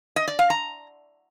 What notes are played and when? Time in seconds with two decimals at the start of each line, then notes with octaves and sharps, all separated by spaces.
0.16 D#5
0.28 D5
0.39 F5
0.50 A#5